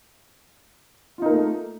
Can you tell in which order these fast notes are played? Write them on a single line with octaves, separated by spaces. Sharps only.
F4 D#4 A#4 A#3 A3